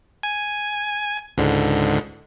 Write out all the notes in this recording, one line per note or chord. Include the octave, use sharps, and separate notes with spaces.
G#5
C#2 G#2 D3